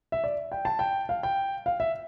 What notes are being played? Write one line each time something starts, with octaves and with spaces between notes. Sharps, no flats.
E5
D5
G5
A5
G5
F5
G5
F5
E5